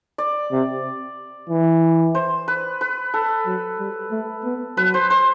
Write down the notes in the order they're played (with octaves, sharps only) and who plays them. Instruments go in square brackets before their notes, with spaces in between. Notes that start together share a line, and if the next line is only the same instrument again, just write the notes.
[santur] D5
[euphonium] C3
E3
[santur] C5
B4
B4
A4
[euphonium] F#3
G3
A3
B3
[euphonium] F#3 [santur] B4
[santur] C5
C5